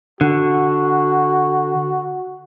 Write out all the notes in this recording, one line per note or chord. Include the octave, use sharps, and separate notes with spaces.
D3 F#4